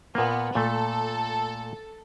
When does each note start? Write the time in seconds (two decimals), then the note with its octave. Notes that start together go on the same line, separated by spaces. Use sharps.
0.15 A#2 A#3 B3
0.55 A#2 A3 A4